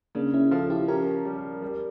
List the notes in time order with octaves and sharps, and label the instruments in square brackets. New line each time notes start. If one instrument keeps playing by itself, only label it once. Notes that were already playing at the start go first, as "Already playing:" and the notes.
[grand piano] C#3 [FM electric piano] A#3 D4
[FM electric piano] C#4 E4
[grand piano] F3 [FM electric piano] F4 A4
[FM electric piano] E4 G4
[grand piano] C#4 [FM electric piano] G4 A#4
[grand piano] G3
G3